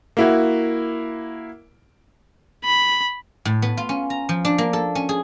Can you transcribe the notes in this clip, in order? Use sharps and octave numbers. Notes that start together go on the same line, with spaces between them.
A#3 E4 F#4
B5
A2
B3
F4
C#4
A#5
F3
D4
A#3
A4
C#4
G#4